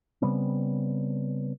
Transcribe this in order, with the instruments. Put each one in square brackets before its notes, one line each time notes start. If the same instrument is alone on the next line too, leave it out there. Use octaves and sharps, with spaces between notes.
[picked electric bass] C#3 G3 B3 C4